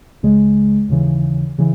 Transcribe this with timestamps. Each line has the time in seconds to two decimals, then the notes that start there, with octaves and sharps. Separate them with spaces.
0.23 C#2 C#3 G#3
0.89 D#2 C#3 E3
1.58 C#3 E3